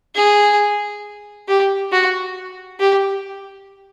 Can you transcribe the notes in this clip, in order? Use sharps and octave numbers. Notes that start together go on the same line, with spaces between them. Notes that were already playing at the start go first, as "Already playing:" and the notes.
G#4
G4
F#4
G4